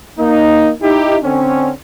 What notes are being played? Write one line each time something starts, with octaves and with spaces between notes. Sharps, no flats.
A#3 D#4
D#4 E4 G4
D3 C4 C#4